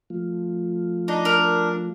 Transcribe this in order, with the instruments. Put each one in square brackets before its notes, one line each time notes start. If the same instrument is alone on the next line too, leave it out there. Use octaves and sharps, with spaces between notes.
[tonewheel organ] F3 A3 F4
[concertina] D4 [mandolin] D#4
[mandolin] A#4